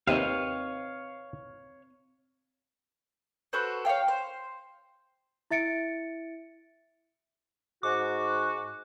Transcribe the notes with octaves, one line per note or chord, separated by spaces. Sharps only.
D#2 C3 C4 B4 C#5 D#5 F5
F#4 A4 B4 C5
C#5 D5 F5 G5
C5
E4 E5 A6 C#7 D7
G#2 F#4 D6